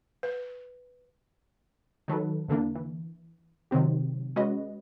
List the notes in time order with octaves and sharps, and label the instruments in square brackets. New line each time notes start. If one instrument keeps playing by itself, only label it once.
[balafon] B4
[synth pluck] D#3 F#3 A4 B4
E2 D3 E3 A#3 D4
E3
C3 D#3 F#3 C4 G4
G#3 C#4 F#4 B4 D5 D#5